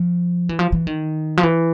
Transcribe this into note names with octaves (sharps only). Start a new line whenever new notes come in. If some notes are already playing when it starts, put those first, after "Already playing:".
Already playing: F3
E3
F3
E3
D#3
F3
E3